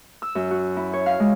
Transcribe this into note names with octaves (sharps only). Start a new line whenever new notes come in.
E6
F#2
F#4
E4
C#5
F5
G#3